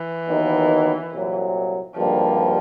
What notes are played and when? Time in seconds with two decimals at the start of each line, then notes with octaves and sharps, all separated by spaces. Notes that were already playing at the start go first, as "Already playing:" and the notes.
Already playing: E3
0.27 D#2 D#3 F#3 B3 D#4
1.12 C2 A#2 F#3
1.95 G#1 G2 D3 F3 G3 A#3